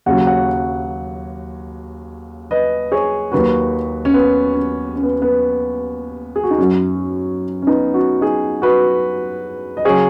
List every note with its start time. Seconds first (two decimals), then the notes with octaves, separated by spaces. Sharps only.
0.06 D#2 C#3 F#3 F#5
0.27 C#5 F#5
2.51 B4 D#5
2.92 G#4 C#5
3.32 D#2 D#3 F#3 F#4 B4
4.05 C#4
4.14 B3
4.54 C#4
4.96 C#4
5.03 B3
5.22 B3
6.36 G#4
6.43 F#4
6.51 D#4
6.58 F#2 F#3 C#4
7.62 C#4
7.67 B3 D#4
7.94 C#4 F#4
8.21 D#4 G#4
8.62 F#4 B4
9.77 D#5
9.85 C#3 F#3 G#4 C#5